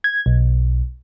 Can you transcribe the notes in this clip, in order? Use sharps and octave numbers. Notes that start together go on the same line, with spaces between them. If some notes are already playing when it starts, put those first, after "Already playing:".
G#6
B1